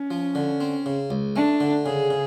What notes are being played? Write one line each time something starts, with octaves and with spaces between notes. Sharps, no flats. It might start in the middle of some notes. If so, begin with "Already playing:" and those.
Already playing: C#4
F3
D3
C4
C#3
C#2
A3 D4
D3
C#3 G#4
C#3